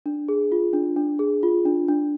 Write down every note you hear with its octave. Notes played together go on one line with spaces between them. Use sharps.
D4
G#4
F4
D4
D4
G#4
F4
D4
D4